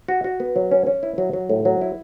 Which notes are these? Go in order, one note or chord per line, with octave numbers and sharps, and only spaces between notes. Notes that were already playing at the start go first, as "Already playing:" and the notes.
F#4
F#4
B3
F#3
C#4
C#4
E4
F#3
F#3
A2
F#3
E4